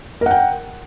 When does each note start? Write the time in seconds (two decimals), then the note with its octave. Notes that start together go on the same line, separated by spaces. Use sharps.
0.21 A#4
0.26 F#5
0.31 G5